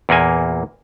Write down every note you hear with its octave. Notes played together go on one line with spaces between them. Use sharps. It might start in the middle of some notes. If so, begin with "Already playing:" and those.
E2 A#2 A#3 G#5